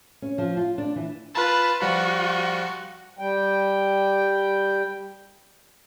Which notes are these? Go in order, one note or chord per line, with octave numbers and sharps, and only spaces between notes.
C#4
F3
F4
D4
E3
F4 B4 A5
F3 G3 F4 F#4
G3 G5